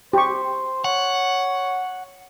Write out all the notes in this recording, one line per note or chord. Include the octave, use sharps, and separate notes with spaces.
G4 C5 C#6
C#5 F#5